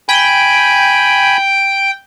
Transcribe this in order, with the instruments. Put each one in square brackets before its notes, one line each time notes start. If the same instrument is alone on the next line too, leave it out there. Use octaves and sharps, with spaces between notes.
[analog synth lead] G5 [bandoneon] G#5 B5